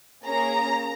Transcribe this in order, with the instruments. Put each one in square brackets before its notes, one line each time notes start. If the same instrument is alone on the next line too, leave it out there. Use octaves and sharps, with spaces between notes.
[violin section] A#3 C#4 G#4 A#5